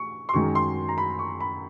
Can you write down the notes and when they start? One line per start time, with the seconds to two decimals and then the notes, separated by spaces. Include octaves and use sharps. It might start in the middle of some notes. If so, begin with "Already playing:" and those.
Already playing: C#6
0.29 C6
0.34 F#2 D#3 G#3 C#6
0.55 C6
0.89 A#5
0.98 B5
1.19 C#6
1.41 B5